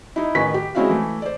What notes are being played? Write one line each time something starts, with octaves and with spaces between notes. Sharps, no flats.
D#4 E4
A1 D#3 B4 G#5 C#6 B6
G4
G#3 C4 C#4 E4 F#4 F5
E3 A3
C5 D5